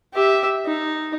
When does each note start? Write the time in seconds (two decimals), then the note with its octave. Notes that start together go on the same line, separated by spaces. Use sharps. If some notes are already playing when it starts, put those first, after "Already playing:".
0.14 G4 E5
0.66 D#4